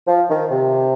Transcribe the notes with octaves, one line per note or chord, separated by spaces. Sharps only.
F3
D#3
C3